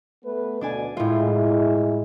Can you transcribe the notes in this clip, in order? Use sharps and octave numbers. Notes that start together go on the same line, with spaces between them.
A3 B3 B4
D2 B2 D4 D5 G#5
A2 G#3 E4 F4